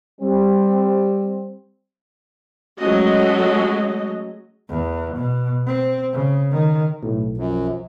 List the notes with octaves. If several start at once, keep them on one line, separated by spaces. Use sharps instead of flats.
G3 C4
F#3 G#3 A3 C#4 F#4 D#5
E2
B2
C4
C#3
D#3
B1 A2
F#2 F3